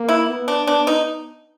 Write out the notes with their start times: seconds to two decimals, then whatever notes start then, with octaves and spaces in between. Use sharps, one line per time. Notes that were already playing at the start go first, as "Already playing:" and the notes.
Already playing: A#3
0.09 E4
0.29 B3
0.48 D4
0.67 B3 D4
0.87 D#4